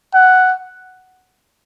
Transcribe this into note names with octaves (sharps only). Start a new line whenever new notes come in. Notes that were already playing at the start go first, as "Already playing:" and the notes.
F#5